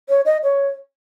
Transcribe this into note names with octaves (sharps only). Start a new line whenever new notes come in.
C#5
D#5
C#5